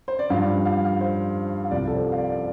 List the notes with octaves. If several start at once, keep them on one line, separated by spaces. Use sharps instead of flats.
C5
D5
G2 F3 F5
F5
F5
C5
F5
C2 C3 F3 D5
A4
C5
F5
D5
D5